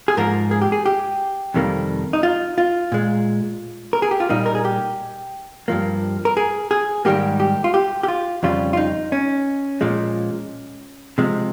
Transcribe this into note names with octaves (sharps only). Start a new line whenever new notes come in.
G#4
G#2 F3 A#3 A#4
G#4
G4
G#4
G4
F2 C3 D#3 G3 A#3
D#4
F4
F4
A#2 G#3
A#4
G#4
G4
F4
A#2 G3 A#3 D#4
A#4
G#4
G4
G2 F3 A#3
A#4
G#4
G#4
G#2 D#3 G3 A#3 G4
G4
F4
G4
G4
F4
F2 C#3 G3 F4
F4
D#4
C#4
A#2 F3 G#3
C3 F3 G#3